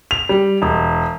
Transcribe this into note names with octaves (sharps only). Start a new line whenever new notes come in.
F7
G3
E1